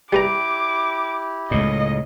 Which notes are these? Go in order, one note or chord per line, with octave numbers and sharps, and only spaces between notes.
G3 E4 G4 B4 A#5 D6
C#2 A2 D#5